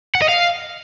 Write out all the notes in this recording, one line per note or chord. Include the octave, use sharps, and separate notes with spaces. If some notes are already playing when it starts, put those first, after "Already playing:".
F#5
D#5
F5